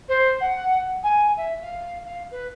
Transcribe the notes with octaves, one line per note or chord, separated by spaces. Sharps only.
C5
F#5
G#5
E5
F5
F5
B4